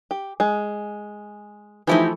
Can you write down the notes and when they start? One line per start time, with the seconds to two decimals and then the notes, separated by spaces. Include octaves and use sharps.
0.11 G4
0.40 G#3
1.87 E3 F3 A3 D#4 E4 G4